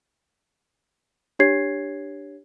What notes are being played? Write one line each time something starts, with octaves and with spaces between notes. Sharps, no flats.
D4 G4 C#5 G#6 C7